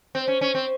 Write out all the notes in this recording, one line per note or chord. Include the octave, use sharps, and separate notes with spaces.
C4
C#4
C#4
C4